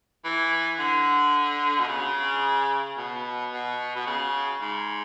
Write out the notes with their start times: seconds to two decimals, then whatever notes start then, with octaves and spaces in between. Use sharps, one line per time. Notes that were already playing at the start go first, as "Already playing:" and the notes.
0.25 E3
0.79 D3
1.80 B2
1.88 C#3
2.98 B2
3.52 B2
3.96 B2
4.07 C#3
4.61 G#2